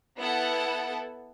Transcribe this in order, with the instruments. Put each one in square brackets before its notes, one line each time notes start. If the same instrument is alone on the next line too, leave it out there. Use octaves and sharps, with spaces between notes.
[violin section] B3 E4 A4 F#5 A5